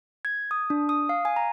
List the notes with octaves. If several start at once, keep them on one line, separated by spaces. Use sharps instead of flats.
G#6
D#6
D4
D#6
F5
G#5
A#5